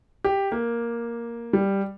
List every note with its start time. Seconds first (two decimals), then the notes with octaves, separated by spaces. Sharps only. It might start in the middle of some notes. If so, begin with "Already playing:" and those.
0.24 G4
0.52 A#3
1.53 G3